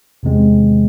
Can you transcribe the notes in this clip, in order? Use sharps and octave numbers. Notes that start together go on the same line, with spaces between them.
E2 C3 D#3 G#3 C4